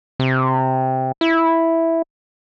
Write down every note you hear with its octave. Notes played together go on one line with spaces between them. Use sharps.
C3
E4